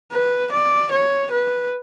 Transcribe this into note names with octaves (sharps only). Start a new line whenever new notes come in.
B4
D5
C#5
B4